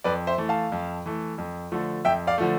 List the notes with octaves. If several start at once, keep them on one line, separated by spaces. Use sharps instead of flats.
F2 B4 D5
C5 E5
E3 A3
F5 A5
F2
E3 A3
F2
D3 F3 A3
F2 E5 G5
D5 F5
D3 F3 A3